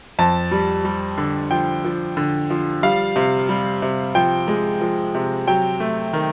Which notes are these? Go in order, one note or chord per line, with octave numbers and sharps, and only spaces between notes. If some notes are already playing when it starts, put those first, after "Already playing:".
F2 A5
G3
G3
D3
F3 G5
F3
D3
F3
G3 F5
C3
G3
C3
F3 G5
G#3
F3
C3
F#3 G5
A3
D#3